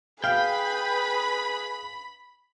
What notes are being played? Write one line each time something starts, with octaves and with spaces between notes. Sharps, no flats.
G#4 B4 F5 G5 B5